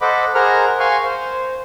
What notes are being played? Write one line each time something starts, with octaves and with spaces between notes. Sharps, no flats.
A4 C5 D#5 F#5 B5 D6
G#4 A#4 C5 F#5 A#5 F6
F5 G#5 C6 C#6
C5